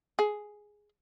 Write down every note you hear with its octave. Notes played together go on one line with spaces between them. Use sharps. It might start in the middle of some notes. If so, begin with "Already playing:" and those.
G#4